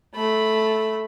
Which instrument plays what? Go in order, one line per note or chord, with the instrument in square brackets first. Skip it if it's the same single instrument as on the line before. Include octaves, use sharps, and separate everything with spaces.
[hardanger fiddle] A3 B5